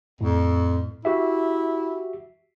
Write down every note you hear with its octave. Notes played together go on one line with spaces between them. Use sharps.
F2 A2
E4 F#4 G4 E5